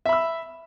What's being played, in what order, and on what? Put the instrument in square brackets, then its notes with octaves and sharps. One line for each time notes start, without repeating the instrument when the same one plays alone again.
[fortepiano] E5
B5
E6